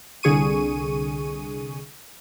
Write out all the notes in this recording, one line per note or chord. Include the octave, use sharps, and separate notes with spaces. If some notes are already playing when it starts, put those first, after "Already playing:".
C2 D3 G#4 C#6 D#7